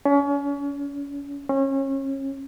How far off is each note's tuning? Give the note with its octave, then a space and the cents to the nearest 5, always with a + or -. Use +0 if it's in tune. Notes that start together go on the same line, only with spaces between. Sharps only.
C#4 +35
C#4 -30